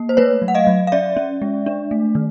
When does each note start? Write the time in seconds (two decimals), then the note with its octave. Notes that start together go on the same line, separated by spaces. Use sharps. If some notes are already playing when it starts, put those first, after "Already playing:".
Already playing: A#3
0.09 C5
0.17 A3 B4 C#5
0.42 F#3
0.48 F#5
0.55 D#5 F5
0.67 F#3
0.87 F5
0.92 C#4 D5 E5
1.17 C#4
1.42 G#3
1.66 D4
1.91 A3
2.15 D#3